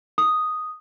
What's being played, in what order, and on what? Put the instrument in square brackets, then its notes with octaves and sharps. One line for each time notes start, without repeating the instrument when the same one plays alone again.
[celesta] D#6